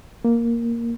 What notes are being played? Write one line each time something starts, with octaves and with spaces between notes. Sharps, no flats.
A#3